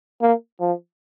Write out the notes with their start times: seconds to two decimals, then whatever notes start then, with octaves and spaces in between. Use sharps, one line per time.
0.21 A#3
0.60 F3